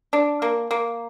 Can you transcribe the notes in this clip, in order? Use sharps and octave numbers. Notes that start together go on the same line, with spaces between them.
D4
A#3
A#3